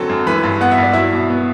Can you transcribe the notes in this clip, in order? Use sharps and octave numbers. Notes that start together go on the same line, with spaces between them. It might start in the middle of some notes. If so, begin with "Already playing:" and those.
Already playing: D3 F#3 C4 F#4 A4 A5
F#2
E3 B4 B5
G2
B3 F#5
E5
G2 D5
F#3 E4 E5
B2
B3